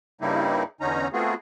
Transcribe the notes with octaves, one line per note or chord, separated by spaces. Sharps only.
G2 C#3 G3 A#3 D#4 E4
E2 D3 C#4 D#4 A#5
A3 B3 C4 F4 F#4 G#4